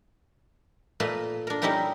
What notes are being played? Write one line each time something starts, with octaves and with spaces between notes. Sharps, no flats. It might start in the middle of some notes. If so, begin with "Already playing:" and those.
A#2 A3 A#3 B4 D#5 F5
D4 A#4
G3 C#4 D#4 E4 G4 A#4